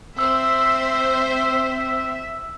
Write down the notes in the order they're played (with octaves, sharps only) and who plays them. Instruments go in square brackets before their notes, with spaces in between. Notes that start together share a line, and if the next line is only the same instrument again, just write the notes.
[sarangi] C4 [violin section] C5 [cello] E5 [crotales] E6